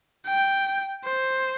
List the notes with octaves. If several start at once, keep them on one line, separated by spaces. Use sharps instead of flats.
G5
C5